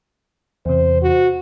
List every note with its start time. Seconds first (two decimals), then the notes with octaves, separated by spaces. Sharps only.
0.66 E2 C3 C5
1.02 F#4